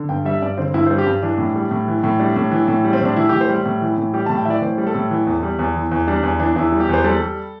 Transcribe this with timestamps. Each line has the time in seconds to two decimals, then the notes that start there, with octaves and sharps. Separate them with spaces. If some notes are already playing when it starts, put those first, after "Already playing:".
Already playing: D3
0.09 G2 G5
0.25 G3 E5
0.42 G2 D5
0.57 D3 C4
0.74 G2 E4
0.86 G3 C5
0.98 G4
1.07 G2
1.22 E3 D4
1.38 A2
1.56 G3
1.71 A2
1.88 E3
2.04 A2
2.19 G3 D4
2.36 A2
2.51 E3
2.68 A2
2.85 G3
2.93 C4
3.01 A2 D4
3.16 E3 E4
3.29 A2 G4
3.41 C5
3.49 G3
3.66 A2
3.81 E3
3.97 A2
4.13 G3 G4
4.26 A2 A5
4.37 G5
4.45 E3 D5 E5
4.62 A2 C5
4.78 G3
4.87 A4
4.95 A2
5.11 E3
5.27 E2
5.43 G3
5.59 E2
5.75 E3
5.91 E2
6.08 G3 D4
6.23 E2
6.39 E3 D4
6.56 E2 E4
6.72 G3
6.80 G4
6.89 E2 C5
7.04 G3 A4
7.20 G3